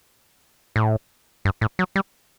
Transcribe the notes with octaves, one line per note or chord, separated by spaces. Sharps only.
A2
G2
A2
F#3
G3